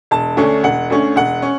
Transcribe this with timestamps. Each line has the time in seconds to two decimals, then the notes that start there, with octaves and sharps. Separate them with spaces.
0.11 E1 A5
0.37 D2 D3 A3 C#4
0.63 E1 F#5
0.90 D2 D3 A3 C#4
1.16 E1 F#5
1.42 C#4